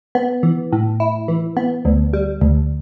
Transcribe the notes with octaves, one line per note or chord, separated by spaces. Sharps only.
B3
E3
A2
E4
E3
B3
D2
G3
D2